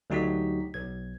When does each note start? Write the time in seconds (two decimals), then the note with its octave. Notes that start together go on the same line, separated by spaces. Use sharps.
0.10 D2 F#3 D#4 F#4 G4 B6
0.74 B1 G#6